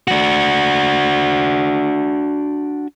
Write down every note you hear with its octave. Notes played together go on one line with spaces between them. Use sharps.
D4 F#4